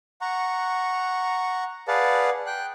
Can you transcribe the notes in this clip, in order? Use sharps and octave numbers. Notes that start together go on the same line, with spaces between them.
F#5 A#5 C#6
G#4 B4 D5 F5 F#5 A5
G5 F#6